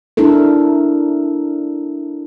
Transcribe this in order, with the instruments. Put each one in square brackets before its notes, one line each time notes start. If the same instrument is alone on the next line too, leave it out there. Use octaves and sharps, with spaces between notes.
[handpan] D4 E4 A4 A#4